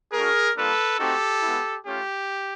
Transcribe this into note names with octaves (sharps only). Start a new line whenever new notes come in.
A3 D4 F#4 G#4 A#4
G3 A#3 D4 F4 A4 B4
A3 C4 D#4 F#4 G4 A4
G#3 B3 E4
A3 C#4 F4 G4